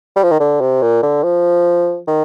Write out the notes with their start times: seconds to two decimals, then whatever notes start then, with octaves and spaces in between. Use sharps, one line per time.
0.16 G3
0.23 F3
0.31 D#3
0.40 D3
0.61 C3
0.82 A#2
1.03 D3
1.23 F3
2.08 D#3